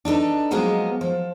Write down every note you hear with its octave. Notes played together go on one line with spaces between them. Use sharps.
D4 D#4 A4 B4
F3 F#3 G#3 A#3 B3 D#4
F3